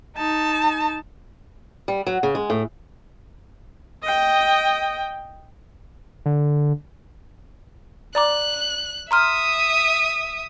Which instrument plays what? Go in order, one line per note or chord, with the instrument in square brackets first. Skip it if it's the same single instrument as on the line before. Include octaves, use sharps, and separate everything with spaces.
[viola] D#4 A5
[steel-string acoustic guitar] G3
F#3
C#3
G#3
A2
[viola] D#5 G5
[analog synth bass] D3
[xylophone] D5 A#5 D6 [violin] F#6
[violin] E5 D#6 [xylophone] A#5 C6 F6